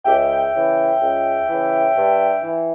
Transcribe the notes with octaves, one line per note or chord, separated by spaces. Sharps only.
C#2 E5 G5
C#3 E3
C#2
C#3 E3
G2
E3